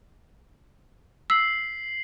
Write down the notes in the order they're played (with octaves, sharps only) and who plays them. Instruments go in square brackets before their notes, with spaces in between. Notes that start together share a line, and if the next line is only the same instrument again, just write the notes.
[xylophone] E6 [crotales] B6 C7 F#7